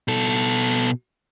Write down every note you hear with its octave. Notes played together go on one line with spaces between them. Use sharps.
B2 A4